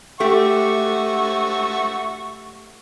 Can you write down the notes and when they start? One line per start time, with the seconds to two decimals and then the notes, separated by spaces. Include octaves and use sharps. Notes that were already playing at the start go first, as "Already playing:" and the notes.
0.20 A3 G4 E5 F#5 C#6